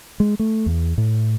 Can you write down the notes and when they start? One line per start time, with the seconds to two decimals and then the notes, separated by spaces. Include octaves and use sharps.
0.20 G#3
0.39 A3
0.66 E2
0.98 A2